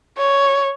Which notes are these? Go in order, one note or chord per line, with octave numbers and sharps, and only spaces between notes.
C#5